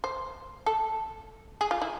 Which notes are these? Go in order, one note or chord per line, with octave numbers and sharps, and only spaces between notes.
C5
A4
G#4
F4
E4